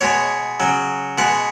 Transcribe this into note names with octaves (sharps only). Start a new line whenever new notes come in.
B2 G#3 C#5
C#3 F#3
B2 G#3 F#5